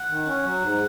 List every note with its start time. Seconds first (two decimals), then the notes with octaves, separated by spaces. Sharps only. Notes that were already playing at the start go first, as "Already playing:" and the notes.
Already playing: F#5
0.08 D#3
0.25 C#4
0.43 F#3
0.60 G#2